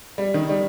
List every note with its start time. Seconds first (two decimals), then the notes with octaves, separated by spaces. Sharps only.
0.18 G3
0.34 D#3
0.49 G3